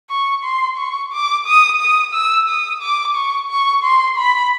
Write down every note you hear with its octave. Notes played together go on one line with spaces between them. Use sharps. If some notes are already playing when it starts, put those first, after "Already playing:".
C#6
C6
C#6
D6
D#6
D#6
E6
D#6
D6
C#6
C#6
C6
B5